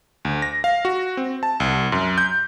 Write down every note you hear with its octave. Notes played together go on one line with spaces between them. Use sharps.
D2
A#6
F5
F#4
C4
A5
C2
F#2
G6